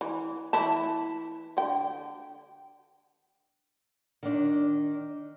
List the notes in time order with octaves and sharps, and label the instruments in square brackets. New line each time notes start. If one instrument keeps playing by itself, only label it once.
[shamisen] E3
E3 E4 A5
D3 G5
[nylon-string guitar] D#3 D4